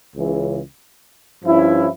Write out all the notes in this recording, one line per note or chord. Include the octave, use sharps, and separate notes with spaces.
C#2 C#3 E3
G2 F3 C#4 E4